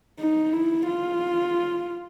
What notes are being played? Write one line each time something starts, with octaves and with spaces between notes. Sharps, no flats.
D#4
E4
F4